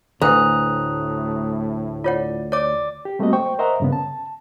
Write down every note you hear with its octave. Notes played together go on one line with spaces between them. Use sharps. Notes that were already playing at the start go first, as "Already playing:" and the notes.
D2 A2 A4 B4 F#5 A#5 D#6 F#6
F4 C#5 D5 F#5
C#5 D5 D6
G4
G3 A3 A#3 C4 F#4 D#5
C5 G5 C#6
A#4 C5 D#5 E5 F#5 A#5
G2 C#3 B3
A5